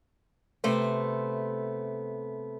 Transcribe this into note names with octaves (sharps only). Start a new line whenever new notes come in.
C3 A3 B3 C5